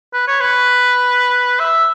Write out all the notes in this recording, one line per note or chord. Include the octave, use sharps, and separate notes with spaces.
B4
C#5
B4
E5